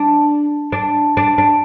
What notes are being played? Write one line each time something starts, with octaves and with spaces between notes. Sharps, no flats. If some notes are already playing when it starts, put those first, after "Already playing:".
Already playing: D4
D4
D4
D4